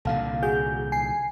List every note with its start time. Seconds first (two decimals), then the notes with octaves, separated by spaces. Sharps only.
0.05 C2 A#2 D3 A4 F5
0.43 F#4 G#4 G6
0.92 G#5 C7